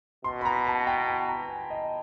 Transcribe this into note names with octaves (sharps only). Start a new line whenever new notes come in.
B2 C6
B5
A#5
A5
G5
B5
A#5
G#5
D#5